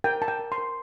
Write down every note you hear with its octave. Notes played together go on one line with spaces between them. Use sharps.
A#4 G5
A#4 A5
G5
A#4
C6
A#4